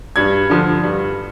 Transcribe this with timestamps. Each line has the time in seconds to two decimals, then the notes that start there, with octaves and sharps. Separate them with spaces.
0.16 G2 G#6
0.50 D3 F3
0.83 G2